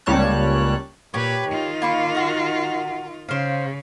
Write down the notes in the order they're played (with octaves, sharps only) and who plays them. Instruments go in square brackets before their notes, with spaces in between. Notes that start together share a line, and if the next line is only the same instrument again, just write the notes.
[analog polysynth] C#2 G3 A#3 C#5 A5 F#6
[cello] A#2 B4 [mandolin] G4 C#5
[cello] D#3 F4
[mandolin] A#3 B5 C#6
F#4 A#4
[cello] C#3 [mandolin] C5 F5